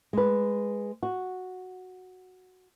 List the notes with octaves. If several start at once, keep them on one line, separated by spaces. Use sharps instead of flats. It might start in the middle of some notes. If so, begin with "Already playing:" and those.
G#3 B4
F#4